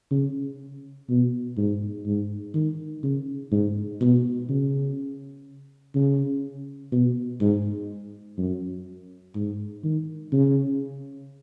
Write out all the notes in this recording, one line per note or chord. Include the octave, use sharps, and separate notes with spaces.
C#3
B2
G#2
G#2
D#3
C#3
G#2
B2
C#3
C#3
B2
G#2
F#2
G#2
D#3
C#3